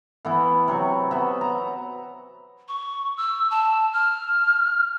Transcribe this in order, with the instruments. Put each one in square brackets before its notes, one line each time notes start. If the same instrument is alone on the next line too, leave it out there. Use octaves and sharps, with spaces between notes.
[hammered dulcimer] E3 B3 E4
C3 F#3 C#6
B3 E5 B5
A#5
[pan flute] C#6
E6
A5
F6